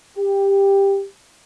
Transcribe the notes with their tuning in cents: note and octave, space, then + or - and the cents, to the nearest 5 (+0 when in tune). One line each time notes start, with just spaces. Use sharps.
G4 +10